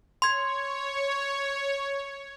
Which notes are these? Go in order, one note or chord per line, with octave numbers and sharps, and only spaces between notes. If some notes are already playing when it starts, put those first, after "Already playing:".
C#5 C6 G#6